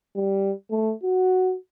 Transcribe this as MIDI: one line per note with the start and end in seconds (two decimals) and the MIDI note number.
0.16 0.52 55
0.71 0.93 57
1.03 1.55 66